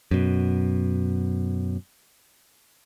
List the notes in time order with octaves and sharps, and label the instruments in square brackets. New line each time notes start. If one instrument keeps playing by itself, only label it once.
[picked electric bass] F#2 B2